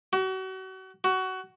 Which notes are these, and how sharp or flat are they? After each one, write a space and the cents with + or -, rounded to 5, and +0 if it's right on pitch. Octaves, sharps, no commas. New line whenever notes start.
F#4 +35
F#4 +20